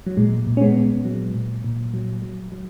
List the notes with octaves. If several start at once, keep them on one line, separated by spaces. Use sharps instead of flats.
F#3
A#2 G#3
A#2
C#4
G#3 B3
A#2
F#3
A#2
A#2
F#3
F#3
F#3